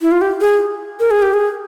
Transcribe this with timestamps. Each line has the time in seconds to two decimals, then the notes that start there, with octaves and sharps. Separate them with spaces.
0.02 E4
0.11 F4
0.21 G4
0.41 G#4
1.00 A#4
1.11 G#4
1.22 G4
1.34 G#4